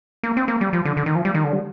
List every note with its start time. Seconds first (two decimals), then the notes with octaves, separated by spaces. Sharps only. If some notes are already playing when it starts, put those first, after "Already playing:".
0.23 A#3
0.37 C4
0.48 A#3
0.61 G3
0.73 F3
0.85 D3
0.97 D3
1.06 D#3
1.15 F3
1.25 G3
1.34 D#3
1.44 D3
1.53 G3